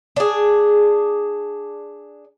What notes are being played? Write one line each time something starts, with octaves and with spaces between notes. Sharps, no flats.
D4 G#4